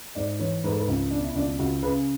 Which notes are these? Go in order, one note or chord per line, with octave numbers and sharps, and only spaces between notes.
G#2 D5
E3 C#5
G#2 B4
A4
B4
C#2
B2 D4
E4
C#2 D4
C#2 F#4
C#3 B4